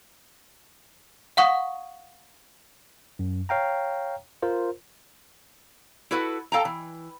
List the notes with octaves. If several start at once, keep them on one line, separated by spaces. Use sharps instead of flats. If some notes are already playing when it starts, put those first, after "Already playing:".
F5 F#5 C#6 D#6
F#2
C#5 F5 G5 A#5
F4 A#4 C5
E4 F#4 A4 B4 F#5
A4 F5 G5 A5 A#5
E3